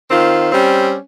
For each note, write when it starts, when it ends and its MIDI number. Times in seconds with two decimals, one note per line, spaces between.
0.11 0.51 51
0.11 0.51 60
0.11 0.51 65
0.52 0.97 55
0.52 0.97 60
0.52 0.97 61